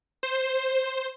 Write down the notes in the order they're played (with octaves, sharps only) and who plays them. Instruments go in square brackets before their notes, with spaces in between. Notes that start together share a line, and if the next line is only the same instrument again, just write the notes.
[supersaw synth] C5